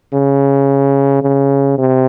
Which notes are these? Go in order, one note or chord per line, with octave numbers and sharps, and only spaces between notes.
C#3
C#3
C3